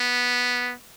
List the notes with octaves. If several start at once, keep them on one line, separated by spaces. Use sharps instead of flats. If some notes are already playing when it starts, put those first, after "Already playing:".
Already playing: B3